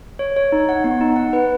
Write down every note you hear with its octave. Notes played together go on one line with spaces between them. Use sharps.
C#5
C#5
D#4
F#5
B3
D#4
F#5
B4